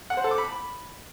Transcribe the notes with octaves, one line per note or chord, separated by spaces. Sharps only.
F#5
C5
A4
D6
B5